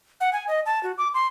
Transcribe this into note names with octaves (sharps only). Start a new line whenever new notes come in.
F#5
G#5
D#5
A5
F#4
D6
C6